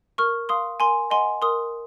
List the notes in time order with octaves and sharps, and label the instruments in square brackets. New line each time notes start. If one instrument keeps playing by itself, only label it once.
[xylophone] A#4 C#6 F6
F5 C6 D#6
A#4 G#5 C6
D#5 F#5 G#5 C6
A#4 C6 D#6